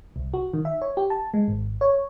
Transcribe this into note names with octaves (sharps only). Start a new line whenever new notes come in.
C2
F#4
D#3
E5
C#5
G4
A5
G#3
G#1
C#5